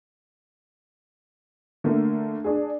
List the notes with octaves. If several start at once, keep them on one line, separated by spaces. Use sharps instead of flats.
D3 A3 A#3
D4 G#4